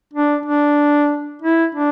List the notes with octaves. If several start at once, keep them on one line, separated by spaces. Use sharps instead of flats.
D4
D4
E4
D4